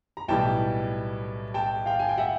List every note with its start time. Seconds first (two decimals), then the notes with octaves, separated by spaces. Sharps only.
0.17 A#5
0.28 B1 A2 E3 G3 G5 A5
1.54 G5 A5
1.86 F5 G5
1.99 G#5
2.09 G5
2.18 E5 F#5